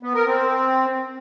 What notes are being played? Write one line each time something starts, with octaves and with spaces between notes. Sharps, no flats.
B3
A#4
C4